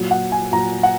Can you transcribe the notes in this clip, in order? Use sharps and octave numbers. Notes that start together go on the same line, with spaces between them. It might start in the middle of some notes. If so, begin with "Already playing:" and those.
Already playing: A#2 F#3
F#5
G#5
A#2 F#3 A#5
F#5